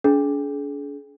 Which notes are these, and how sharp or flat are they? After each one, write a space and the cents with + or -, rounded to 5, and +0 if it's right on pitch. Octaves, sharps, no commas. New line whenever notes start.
D4 -45 G#4 +35